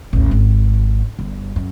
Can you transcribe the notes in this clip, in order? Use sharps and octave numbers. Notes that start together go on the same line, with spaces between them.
A1 D#2
G#1
G1
F#2